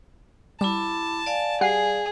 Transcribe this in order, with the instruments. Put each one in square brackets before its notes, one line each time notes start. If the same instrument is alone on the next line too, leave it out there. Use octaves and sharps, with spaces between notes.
[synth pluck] G3 [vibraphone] E4 B5 D6 [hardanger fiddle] A5
[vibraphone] D5 F5 G#5
[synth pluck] G3 F#5 C7 [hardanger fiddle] G#4